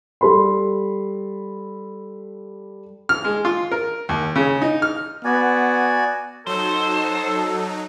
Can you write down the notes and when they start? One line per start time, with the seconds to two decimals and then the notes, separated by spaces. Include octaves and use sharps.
0.21 G3 A4 B5 C6
3.09 F6
3.24 G#3
3.45 F4
3.71 A#4
4.09 D#2
4.36 C#3
4.62 D#4
4.82 F6
5.25 B3 F#4 D5 G#5
6.47 F#3 D#4 A4 C5